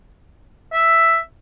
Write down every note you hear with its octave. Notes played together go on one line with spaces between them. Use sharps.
E5